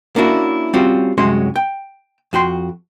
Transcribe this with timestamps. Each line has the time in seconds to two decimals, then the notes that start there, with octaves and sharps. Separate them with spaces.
0.16 A#3 C#4 D4 E4 F#4
0.74 G3 C4 C#4 F4 F#4
1.18 C2 F#2 G#3 C#4 F#4 C6
1.56 G5
2.33 F2 F#4 G5 C6